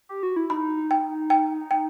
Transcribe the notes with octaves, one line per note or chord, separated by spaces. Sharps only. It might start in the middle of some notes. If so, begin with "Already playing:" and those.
G4
F#4
E4
D#4 B5
G5
G5
G5